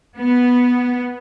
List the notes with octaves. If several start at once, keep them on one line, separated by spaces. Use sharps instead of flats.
B3